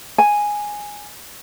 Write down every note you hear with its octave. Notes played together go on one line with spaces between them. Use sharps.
G#5